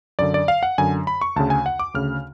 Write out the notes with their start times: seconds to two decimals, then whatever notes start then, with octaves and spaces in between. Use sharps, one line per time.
0.19 F#2 D3 D5
0.34 D5
0.48 F5
0.63 F#5
0.78 F#2 D3 G#5
1.07 B5
1.21 C#6
1.36 D2 C#3 A5
1.50 G#5
1.66 F#5
1.79 D6
1.94 D2 C#3 F6